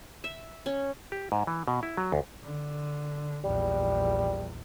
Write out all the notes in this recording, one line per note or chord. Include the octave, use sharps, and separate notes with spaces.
E5
C#4
G4
G#2
E3
B2
E4
F#3
D2
D3
A#1 E2 G3